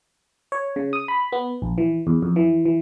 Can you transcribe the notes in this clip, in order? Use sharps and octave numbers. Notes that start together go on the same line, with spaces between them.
C#5
C#3
D#6
B5
B3
A#1
E3
E2
F2
E3
E3